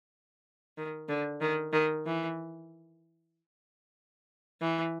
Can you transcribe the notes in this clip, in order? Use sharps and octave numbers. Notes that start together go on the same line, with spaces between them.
D#3
D3
D#3
D#3
E3
E3